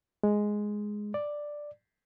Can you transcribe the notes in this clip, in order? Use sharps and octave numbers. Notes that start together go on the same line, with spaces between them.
G#3
D5